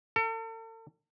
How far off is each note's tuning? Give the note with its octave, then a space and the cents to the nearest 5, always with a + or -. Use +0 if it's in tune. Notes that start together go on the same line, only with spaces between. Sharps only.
A4 +40